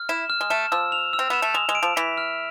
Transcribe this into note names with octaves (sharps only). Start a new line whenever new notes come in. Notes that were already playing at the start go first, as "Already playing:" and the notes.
Already playing: F6
E4 E7
F6
G#3
A3 E7
F3 E6
F7
E6
C4
B3 E7
A3
G#3 F7
G#3
D7
F3
E3 B6
F6